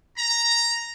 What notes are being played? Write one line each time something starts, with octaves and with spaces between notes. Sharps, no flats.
A#5